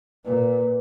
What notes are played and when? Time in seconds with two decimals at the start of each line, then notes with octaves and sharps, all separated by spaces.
0.25 A#2 B4